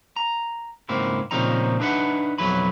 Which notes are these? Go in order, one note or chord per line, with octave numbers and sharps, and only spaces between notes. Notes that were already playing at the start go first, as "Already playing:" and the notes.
A#5
C#2 G#2 A#3 C4 E4
A#2 C#3 F3 C4 D#4 A#5
D4 D#4 B4 E5 F#5
B1 F2 F#3 E4 B4 B5